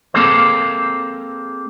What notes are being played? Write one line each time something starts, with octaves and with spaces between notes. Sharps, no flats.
A#3 C4 G#4 A4 C5